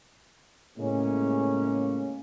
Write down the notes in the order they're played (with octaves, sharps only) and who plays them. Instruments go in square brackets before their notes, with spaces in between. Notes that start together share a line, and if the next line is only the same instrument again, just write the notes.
[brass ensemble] A2 C#3 G#3 A#3 C#4